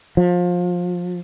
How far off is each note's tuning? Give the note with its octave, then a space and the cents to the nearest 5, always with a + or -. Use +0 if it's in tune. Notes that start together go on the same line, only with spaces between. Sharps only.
F3 +25